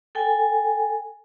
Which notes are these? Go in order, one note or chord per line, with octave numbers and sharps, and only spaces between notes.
A4 G5 G#5